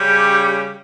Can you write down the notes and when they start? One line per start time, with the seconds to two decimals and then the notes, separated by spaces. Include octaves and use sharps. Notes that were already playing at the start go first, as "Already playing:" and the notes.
Already playing: C#3 G3 C#4 G4